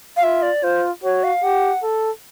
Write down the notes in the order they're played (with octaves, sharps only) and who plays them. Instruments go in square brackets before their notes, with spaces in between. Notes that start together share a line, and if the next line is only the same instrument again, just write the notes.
[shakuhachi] F5
[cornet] F4 [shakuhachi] E5
[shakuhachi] D5
[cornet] F4 [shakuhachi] C5
[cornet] F#4 [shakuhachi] C#5
[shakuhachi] F5
[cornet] G4 [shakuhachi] F#5
[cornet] A4